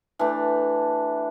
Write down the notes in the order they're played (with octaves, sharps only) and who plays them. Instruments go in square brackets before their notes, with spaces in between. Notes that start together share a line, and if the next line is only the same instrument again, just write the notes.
[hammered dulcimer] E3 A3 D4